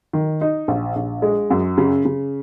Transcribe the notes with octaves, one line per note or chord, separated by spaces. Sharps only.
D#3
D#4
A#1
A#1
G#3
F#2
C#3
C#3